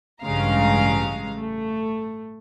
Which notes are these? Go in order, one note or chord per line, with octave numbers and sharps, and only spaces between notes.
A1 G2 C#3 G#3 F5 A#5
A3